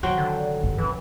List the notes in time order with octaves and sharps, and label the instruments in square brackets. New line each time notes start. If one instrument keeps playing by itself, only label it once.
[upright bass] C3 D#3 [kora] F#3 C5 G5
[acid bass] D3
[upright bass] G2 G3
[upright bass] C#2 C3 [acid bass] E3